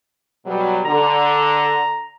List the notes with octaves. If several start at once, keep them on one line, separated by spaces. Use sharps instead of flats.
B2 F#3 G3
D3 A#5